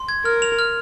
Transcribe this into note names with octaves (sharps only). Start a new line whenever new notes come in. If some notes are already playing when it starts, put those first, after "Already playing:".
Already playing: C6
G#6
A#4 F6
F7
F6